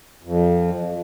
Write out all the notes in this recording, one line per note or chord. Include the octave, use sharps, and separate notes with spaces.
F2